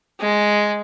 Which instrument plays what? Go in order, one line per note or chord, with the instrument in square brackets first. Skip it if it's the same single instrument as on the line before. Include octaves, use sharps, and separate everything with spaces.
[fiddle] G#3